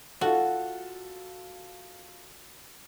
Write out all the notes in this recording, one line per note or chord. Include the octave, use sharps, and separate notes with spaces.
F4 F#4 A4